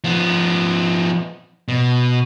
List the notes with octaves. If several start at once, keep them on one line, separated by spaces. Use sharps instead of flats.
F3 B3
B2